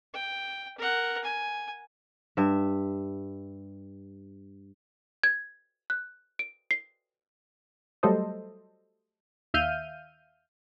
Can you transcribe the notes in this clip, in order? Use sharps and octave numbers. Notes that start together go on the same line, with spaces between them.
G5
A#4 F#5
G#5
G2 E5
G#6
F#6
D7
C7
F#3 G3 A3 A4 C5 D#5
D#2 E5 F5 F6 G6 D#7